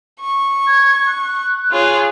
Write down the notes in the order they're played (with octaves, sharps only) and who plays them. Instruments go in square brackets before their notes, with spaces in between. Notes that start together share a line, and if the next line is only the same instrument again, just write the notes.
[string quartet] C#6
[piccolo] G#6
F#6
[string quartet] F4 G#4 C#5